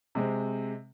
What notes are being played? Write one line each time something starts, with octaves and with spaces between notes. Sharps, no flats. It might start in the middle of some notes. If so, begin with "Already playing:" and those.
C3 G#3 C4